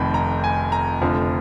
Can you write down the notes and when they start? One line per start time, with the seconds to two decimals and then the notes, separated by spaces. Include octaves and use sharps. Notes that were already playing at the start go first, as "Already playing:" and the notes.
Already playing: F1 F2 D#3 B5
0.14 A#5
0.44 G#5
0.72 A#5
1.01 F1 F2 D3 F3